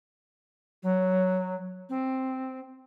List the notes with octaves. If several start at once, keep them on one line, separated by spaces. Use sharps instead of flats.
F#3
C4